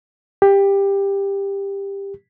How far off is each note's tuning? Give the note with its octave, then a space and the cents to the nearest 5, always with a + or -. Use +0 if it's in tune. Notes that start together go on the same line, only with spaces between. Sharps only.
G4 +15